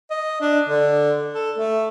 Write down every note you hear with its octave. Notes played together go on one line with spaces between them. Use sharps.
D#5
D4
D3
A4
A3